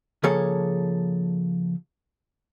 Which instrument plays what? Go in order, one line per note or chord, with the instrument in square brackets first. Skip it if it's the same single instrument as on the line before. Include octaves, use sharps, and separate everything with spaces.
[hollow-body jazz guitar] C#3 F3 A#3 G#4 A4 C#5